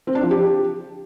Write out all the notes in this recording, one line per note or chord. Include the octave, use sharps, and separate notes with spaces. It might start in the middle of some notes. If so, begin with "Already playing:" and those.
C4
D4
F3
G4